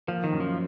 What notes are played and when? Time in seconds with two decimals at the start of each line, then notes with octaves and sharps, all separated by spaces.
0.08 F3 A#3
0.24 D#3
0.32 F#2
0.40 F3